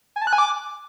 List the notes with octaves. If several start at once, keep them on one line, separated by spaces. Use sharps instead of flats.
G#5
A5
F#6
G#5
D6